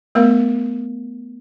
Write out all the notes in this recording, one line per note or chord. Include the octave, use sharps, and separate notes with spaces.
A3 B3 A#4 F5